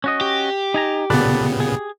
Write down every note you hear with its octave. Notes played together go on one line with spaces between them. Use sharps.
C#4 F#4 D#5
G4
D#4 G#5 A#5
A#2 C#3 B3 A4 B4 D5
G#4